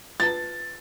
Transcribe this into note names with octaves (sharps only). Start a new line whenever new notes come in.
F4 B4 A5 A6